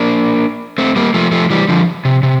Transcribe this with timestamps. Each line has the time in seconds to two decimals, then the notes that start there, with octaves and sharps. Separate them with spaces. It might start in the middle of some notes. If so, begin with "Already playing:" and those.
Already playing: A#3 D4
0.78 A3 C4
0.96 G3 A#3
1.14 F3 A3
1.32 F3 A3
1.50 E3 G3
1.69 D3 F3
2.05 C3
2.23 C3